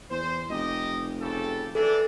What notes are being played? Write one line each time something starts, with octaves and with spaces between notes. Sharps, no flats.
E2 C5
F1 D#4 G4 D#5
C#3 G4 A4
E3 D4 A4